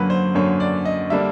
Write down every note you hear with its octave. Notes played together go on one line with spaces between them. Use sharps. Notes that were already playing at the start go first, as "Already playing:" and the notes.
Already playing: F#2 D3 F#3 A#3 B4
C5
F#2 D3 F#3 A#3 C#5
D5
D#5
D3 G3 A#3 D4 E5